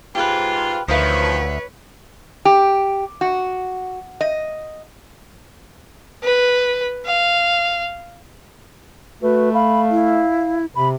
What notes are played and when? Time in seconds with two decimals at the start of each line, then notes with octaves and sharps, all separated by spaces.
0.15 G#2 F4 G4 B4
0.88 D2 D#3 F3 B4 C#5 E5 F5 D#6
2.45 G4
3.21 F#4
4.21 D#5
6.23 B4
7.05 F5
9.22 A3 F#4 B4
9.53 F5 B5
9.90 E4
10.75 C3 B5